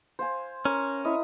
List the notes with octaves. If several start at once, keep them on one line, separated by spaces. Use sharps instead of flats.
C5 F5 G#5
C#4 A#4
E4 D#5